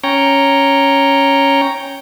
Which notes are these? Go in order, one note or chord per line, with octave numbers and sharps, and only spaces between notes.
C#4 C#5 G5 A#5